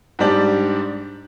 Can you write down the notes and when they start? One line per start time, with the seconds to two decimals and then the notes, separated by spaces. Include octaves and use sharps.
0.19 G#2 G3 D4 G4 D5